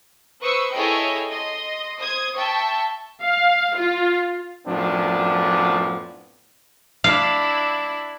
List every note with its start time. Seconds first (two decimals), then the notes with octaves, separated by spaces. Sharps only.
0.42 B4 C5 C#6 D#6 E6 C#7
0.73 E4 G#4 A4 C#5 D#5 G5
1.31 D#5 C6
1.99 C5 D#6 G#6
2.36 E5 G5 A5 C#6
3.22 F5
3.76 F4
4.67 F#2 A2 F3 B3 C4 D4
7.04 D4 E4 F5